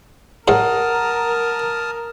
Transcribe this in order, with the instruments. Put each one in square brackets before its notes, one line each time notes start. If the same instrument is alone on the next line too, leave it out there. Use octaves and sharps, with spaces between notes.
[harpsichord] A2 G#3 [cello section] A#4 [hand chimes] F#5 [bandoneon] A5 D#6 F6